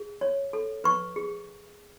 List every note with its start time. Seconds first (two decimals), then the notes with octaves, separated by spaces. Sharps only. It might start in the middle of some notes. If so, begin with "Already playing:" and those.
Already playing: G#4
0.21 C#5
0.53 A4
0.84 B4 C#6
1.16 G#4